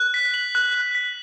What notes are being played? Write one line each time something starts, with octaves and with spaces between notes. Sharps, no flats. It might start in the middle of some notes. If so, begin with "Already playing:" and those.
Already playing: F#6
B6
F#7
F#6
F#6
B6